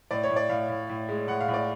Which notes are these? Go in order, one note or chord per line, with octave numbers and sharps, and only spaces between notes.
A2 D5
C#5
A2
D5
A2 F5
A2
A2
G#3
A2 F#5
F5
A2
D5